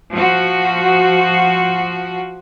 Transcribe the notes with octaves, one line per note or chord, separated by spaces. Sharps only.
F3 F#4